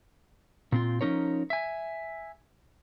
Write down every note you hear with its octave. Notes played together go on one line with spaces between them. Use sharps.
A#2 C4 F4
F3 F#3 C#4 D#4 A#4 C#5
E5 G#5